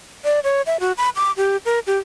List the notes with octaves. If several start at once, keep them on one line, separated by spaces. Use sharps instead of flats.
D5
C#5
E5
F#4
B5
D6
G4
A#4
G4